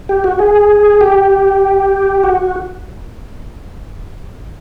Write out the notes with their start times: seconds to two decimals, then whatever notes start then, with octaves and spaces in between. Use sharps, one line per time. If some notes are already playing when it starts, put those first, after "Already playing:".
0.09 G4
0.24 F#4
0.39 G#4
1.01 G4
2.24 F#4